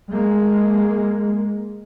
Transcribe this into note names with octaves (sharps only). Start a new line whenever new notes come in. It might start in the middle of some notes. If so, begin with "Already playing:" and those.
G#3 A#3